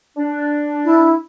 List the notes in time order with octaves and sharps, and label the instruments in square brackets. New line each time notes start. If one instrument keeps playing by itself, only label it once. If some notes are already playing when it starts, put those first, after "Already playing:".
[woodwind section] D4
[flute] E4